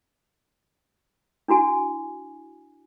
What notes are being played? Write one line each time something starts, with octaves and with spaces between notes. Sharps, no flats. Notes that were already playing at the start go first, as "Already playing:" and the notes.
D4 E4 F#4 G#5